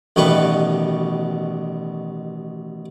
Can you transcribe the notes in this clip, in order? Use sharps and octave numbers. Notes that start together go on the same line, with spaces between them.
A1 B2 D#3 G3 B4 C#6